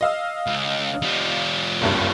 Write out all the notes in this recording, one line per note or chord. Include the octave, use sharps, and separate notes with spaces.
D#5 F5 E6
C#2
G3 F4
F#1 C2 G2